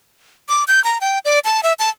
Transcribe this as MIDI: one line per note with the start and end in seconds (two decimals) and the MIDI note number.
0.49 0.64 86
0.68 0.83 91
0.84 0.98 82
1.01 1.19 79
1.25 1.39 74
1.45 1.61 81
1.63 1.73 76
1.79 1.89 81